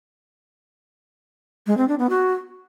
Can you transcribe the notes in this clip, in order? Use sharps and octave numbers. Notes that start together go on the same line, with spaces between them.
G#3
C4
D4
B3
F#4